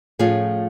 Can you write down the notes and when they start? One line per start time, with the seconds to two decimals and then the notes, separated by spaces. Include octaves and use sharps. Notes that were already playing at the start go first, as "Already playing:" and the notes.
0.19 A2 F3 A3 C#4 F4 G#4